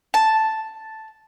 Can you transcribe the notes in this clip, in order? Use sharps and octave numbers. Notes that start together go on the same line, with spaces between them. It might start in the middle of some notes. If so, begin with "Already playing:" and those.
A5